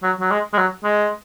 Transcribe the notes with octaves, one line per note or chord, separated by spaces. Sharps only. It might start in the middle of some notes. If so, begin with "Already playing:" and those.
F#3
F#3
G#3
G#3
F#3
G#3